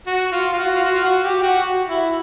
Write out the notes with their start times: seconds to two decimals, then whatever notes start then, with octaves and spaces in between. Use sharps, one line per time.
0.07 F#4
0.32 F4
0.53 F4
0.59 F#4
0.75 F4
0.85 F#4
0.94 F4
1.04 F#4
1.24 G4
1.43 F#4
1.89 E4